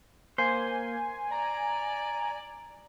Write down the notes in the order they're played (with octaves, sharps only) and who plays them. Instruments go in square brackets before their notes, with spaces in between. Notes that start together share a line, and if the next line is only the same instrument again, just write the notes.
[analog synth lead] A#3 [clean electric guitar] C5 [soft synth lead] G#5
[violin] D5 [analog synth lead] A#5